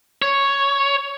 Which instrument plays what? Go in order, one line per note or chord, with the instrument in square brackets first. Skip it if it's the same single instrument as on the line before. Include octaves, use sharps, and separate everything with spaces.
[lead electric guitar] C#5